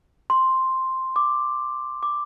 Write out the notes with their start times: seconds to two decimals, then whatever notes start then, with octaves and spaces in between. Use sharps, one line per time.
0.30 C6
1.16 D6
2.03 D6